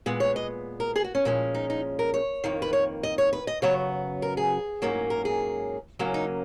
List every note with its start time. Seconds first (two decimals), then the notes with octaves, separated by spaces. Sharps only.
0.06 A#2 G#3 B3
0.20 C#5
0.36 D#5
0.80 A#4
0.96 G#4
1.04 F#4
1.15 C#4
1.25 A#2 F3 G#3 C#4
1.54 D#4
1.70 D#4
1.99 A#4
2.14 C#5
2.44 F2 D#3 A#3
2.62 B4
2.73 C#5
3.03 D#5
3.18 C#5
3.33 B4
3.47 D#5
3.62 F#2 C#3 F#3 B3 C#5
4.22 A#4
4.37 G#4
4.82 G#2 F#3 A#3 C#4
5.10 A#4
5.25 G#4
5.99 C#3 F#3 A#3 C#4
6.14 D#4